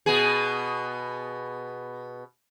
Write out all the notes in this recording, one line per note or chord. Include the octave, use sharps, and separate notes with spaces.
B2 B3 G#4